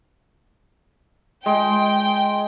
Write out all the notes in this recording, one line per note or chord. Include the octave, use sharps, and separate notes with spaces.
G#3 G5